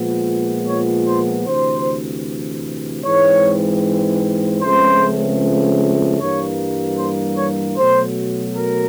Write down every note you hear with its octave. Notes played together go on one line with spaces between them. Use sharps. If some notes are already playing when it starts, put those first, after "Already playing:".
Already playing: A#2 F3 G#3 B3
C#5
C5
D2 C3 E3 C5
G#2 E3 G#3 C4 C#5
C#2 C#3 F3 A3 C4 C5
G2 E3 G3 A#3 C#5
C5
C#5
B2 F#3 A3 C5
A#4